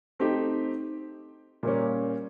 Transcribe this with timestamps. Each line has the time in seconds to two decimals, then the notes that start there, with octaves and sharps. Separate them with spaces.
0.19 A3 C4 D#4 G4
1.63 A#2 G3 A#3 C#4